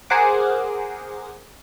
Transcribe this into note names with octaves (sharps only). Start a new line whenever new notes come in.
G#4 A#4 C5 F#5 D6